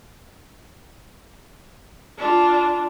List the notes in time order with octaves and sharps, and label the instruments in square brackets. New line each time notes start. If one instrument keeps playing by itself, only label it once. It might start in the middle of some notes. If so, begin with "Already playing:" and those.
[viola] D4 F4